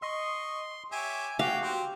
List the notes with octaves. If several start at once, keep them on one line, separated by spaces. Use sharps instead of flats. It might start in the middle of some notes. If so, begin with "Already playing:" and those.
D#5 C6 C#6
G4 C#5 E5 G#5 D7
F#4 G4 F5 G5
C4 G4